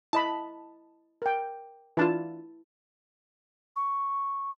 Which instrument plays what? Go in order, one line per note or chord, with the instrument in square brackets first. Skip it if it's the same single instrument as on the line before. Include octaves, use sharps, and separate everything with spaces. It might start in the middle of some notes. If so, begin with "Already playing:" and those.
[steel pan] E4 D#5 B5 [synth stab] A5
[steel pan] A#4 G5
[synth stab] E3 D4 F4 [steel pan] E4 A5
[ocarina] C#6